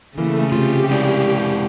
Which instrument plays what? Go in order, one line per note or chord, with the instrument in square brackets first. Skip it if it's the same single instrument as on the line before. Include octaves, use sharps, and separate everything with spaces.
[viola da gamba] C#3 [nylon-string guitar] E3 A#3 [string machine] A3
[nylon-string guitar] C3 [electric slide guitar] F4 [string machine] G4
[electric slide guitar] G#3 E4 D5